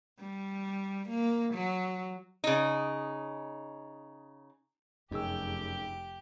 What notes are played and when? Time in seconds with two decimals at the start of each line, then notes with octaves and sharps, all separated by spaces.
0.20 G3
1.09 A#3
1.54 F#3
2.44 C#3 D#4
5.11 F1 F#2 D#4 G4 G#4 G5 E6